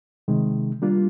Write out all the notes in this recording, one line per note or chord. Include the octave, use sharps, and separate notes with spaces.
C3 D#3 G#3
G3 A#3 D4 F4